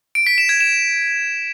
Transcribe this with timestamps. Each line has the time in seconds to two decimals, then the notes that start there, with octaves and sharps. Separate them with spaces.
0.15 D7
0.27 B6
0.38 E7
0.49 G#6
0.61 E7